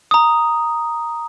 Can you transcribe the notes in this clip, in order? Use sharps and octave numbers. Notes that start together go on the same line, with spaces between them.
A#5 D#6